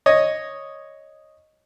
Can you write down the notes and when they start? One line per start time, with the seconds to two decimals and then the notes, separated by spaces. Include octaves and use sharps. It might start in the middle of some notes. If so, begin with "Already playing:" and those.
0.06 C#5 D#5